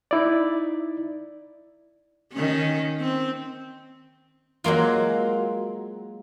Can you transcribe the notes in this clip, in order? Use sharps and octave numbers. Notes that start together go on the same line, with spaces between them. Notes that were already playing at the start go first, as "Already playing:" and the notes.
D#4 E4 D5
D#3 C#4
C4
F#3 G#3 A#3 F4